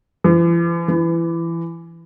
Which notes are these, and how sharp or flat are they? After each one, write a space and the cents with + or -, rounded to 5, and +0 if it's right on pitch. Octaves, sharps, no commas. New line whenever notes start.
E3 +45
E3 +20